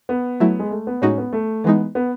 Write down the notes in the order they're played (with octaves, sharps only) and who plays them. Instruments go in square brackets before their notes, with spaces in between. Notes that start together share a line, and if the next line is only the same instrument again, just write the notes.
[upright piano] B3
[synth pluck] F#3 A3 E4
[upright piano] G#3
A3
B3
[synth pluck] A2 G#3 D#4 F#4 [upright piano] C#4
[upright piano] B3
A3
[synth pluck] E3 G#3 D#4 [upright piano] B3
[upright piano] B3